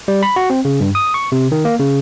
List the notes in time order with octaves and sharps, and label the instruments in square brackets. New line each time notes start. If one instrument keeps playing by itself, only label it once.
[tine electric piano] G3
B5
F#4
C4
C#3
G2
D#6
C#6
C3
D#3
A#3
C#3